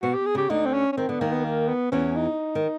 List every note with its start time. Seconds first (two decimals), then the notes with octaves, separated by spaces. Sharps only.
0.03 B2 F#4
0.14 G4
0.26 G#4
0.35 C#3 G4
0.50 D2 D3 D#4
0.66 C4
0.74 C#4
0.93 C#4
0.97 D#3 C4
1.09 D3 B3
1.21 D#2 D#3 A#3
1.32 B3
1.45 A#3
1.68 B3
1.92 E2 E3 C#4
2.16 D#4
2.55 D#3